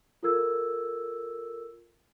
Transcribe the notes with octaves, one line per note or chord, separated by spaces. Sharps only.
F4 A4 A#4 E6 G#6